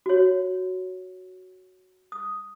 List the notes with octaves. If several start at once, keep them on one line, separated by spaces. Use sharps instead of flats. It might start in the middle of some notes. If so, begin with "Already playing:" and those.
F#4 C#5
D#6